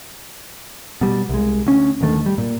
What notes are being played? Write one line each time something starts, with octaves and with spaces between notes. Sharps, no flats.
B2 G3
C2 G#3
D2 C#4
D#1 D2 D#3 A3
G3
A#2